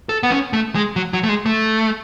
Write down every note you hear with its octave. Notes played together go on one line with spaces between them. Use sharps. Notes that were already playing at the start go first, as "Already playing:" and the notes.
A4
B3
C#4
A3
G#3
F#3
F#3
A3
G#3
A3